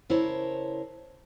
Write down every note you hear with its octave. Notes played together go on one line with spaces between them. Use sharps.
C#3 E4 A#4 C5 C#5 A5